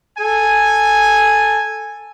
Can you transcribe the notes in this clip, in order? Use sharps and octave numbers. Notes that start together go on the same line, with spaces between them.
A4 G#5